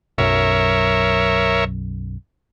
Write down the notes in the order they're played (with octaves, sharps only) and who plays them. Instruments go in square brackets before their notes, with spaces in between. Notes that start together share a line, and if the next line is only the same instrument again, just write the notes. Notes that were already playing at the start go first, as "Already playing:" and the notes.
[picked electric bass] B1 F#2 [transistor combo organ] A#4 C#5 E5